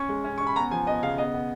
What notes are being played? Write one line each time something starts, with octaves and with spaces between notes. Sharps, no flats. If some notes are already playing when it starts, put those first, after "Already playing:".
Already playing: C#4 C#6
G#3
C#4
C#4 C#6
B5
B3 A#5
F3 G#5
B3 D#5
C#3 F5
B3 D#5
B3